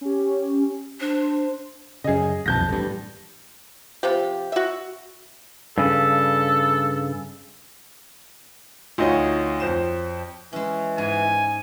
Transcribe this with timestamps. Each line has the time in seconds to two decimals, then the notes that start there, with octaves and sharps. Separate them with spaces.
0.01 C#4 G4
1.01 D4 C5
2.04 F#2 C#3 G#4 D#5
2.46 D#1 B1 F2 A5 G6 A#6
2.69 A1 G2
4.03 C3 F3 G4
4.52 F#4 E5
5.78 G2 C#3 A4
8.98 D2 D#4 F4 F#4 C#5 D#5
9.60 F2 C5 E7
10.53 E3 G#3 C#4
10.98 G#2 G#5